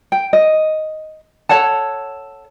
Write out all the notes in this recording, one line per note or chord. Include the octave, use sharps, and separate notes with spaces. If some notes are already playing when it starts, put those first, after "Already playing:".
G5
D#5
A4 C#5 F#5 A5